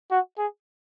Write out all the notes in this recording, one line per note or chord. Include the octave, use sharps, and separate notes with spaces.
F#4
G#4